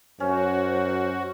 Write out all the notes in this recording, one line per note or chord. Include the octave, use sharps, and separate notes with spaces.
F#2 C#4 F#4 C5